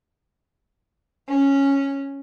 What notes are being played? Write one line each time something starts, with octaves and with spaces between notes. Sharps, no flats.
C#4